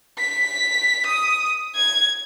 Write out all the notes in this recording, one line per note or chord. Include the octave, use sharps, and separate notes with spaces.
B6
D#6
G#6